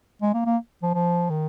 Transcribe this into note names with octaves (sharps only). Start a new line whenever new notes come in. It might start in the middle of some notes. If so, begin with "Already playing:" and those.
G#3
A#3
A#3
F3
F3
D#3